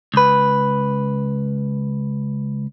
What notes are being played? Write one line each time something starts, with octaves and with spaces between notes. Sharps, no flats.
C#2 B4